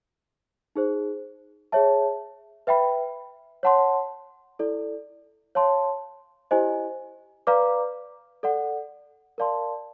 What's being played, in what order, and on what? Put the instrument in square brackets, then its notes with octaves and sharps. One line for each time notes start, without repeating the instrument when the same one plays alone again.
[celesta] D#4 G#4 C5
G#4 C#5 E5 A5
B4 E5 G5 B5
C#5 F#5 A5 C6
E4 A4 D5
C#5 F5 A5 C6
E4 G4 C5 D#5 G#5
B4 D5 F5 A#5 D6
A4 D5 F#5
A#4 D5 F5 A5 C6